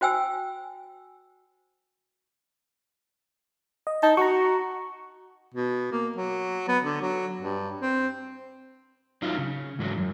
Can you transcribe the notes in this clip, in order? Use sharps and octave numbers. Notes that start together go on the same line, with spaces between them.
F#4 C5 G5 G#5 E6
D#5
D#4 A5
F#4 A#5 C#6
B2
A#3
F#3
B3
D3
F#3
G2
C4
F#3 D#4 F4 F5
C#3 C#4
G#2 E3 F#3
F#2